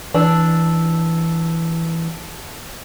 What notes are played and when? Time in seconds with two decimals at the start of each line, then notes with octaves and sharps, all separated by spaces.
0.14 E3 D4 A5 E6